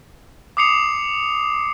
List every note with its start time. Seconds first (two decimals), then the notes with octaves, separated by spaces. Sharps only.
0.57 D6 D#6 C7 C#7 F7